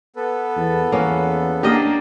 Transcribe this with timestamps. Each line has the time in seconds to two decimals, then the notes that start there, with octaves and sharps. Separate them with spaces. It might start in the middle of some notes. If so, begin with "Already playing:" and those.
0.16 B3 A4 B4
0.57 E2
0.92 E2 A#3 C#4
1.63 A#3 D4 G4 A#4 D#5